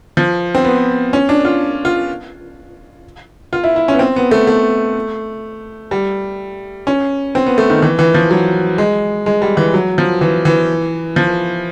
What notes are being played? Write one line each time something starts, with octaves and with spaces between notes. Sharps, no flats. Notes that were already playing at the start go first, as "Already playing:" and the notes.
F3
C4
B3
C#4
D4
F4
F4
F4
E4
E4
C#4
B3
C4
B3
A3
A3
G3
C#4
C4
B3
A3
D#3
E3
E3
F3
F#3
G#3
G#3
G3
E3
F#3
F3
E3
E3
F3